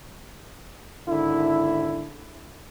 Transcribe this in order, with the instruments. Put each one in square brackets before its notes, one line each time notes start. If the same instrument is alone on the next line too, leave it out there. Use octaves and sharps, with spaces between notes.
[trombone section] G#1 D3 E4